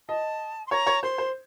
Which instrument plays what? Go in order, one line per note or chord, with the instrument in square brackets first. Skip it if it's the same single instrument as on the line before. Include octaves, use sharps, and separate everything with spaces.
[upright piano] D#5 [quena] A5
[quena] C6
[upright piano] C#5 [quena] A#5
[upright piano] C#5
[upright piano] C5 [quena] C6
[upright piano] C5